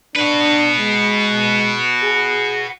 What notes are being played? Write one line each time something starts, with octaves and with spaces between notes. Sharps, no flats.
D4 F#4 B4
G#3
G#4